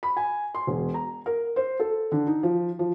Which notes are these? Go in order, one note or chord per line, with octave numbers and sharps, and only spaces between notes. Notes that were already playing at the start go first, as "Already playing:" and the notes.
B5
G#5
C6
E1
A#5
A#4
C5
A4
D3
D#4
F3
F3